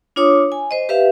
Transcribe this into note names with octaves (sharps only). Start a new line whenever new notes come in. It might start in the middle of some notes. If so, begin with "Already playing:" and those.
D4 F4 C#5 D6 D#6
G#5
C5 D#5
G4 B4 E5 F5